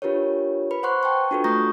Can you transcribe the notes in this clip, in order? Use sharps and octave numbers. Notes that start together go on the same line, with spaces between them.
D4 F4 G4 A#4 B4 C#5
B4 B5
C5 F#5 C6 C#6 F#6
G5 A5 C#6
D4 F4 F#4 A4 B4
A3 A#5 C#6 D#6 G6 A#6